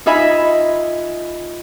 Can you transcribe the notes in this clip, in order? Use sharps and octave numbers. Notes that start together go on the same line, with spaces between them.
D#4 F4 D#5 E5 G#5 B5